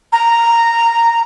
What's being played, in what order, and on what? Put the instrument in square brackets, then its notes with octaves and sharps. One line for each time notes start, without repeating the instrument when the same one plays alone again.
[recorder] A#5